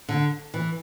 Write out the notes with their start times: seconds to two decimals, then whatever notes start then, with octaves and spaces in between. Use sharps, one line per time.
0.09 D3
0.54 E3